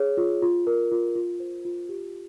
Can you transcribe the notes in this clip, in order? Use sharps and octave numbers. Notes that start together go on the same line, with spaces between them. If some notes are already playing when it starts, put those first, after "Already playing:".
Already playing: G#4 C#5
F4
F4
A#4
F4
F4
C5
F4
G4